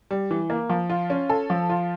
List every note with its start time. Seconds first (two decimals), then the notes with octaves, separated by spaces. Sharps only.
0.11 G3
0.31 E3
0.50 A#3
0.70 F3
0.90 F4
1.10 C#4
1.29 A4
1.50 F3
1.70 F4